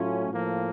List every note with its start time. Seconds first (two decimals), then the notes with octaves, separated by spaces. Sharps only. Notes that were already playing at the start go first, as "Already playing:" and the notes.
Already playing: A2 F#3 A3 C#4 F4
0.29 A2 F3 A#3